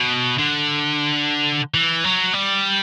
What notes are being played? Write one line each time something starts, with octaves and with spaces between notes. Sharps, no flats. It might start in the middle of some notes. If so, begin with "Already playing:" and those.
Already playing: B2
D3
E3
F#3
G3